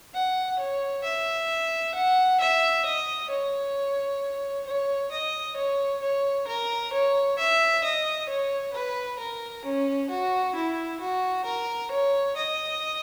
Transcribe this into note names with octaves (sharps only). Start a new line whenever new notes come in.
F#5
C#5
E5
F#5
E5
D#5
C#5
C#5
D#5
C#5
C#5
A#4
C#5
E5
D#5
C#5
B4
A#4
C#4
F#4
E4
F#4
A#4
C#5
D#5